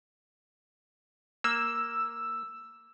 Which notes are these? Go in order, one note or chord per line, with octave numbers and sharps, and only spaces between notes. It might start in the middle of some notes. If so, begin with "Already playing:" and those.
A#3 E6